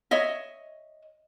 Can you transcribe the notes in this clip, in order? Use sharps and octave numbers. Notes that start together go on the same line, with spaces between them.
C#5 D#5 E5